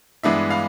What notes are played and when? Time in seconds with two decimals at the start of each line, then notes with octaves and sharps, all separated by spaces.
0.23 G2 E3 G#3 B3 D4 E5
0.50 F5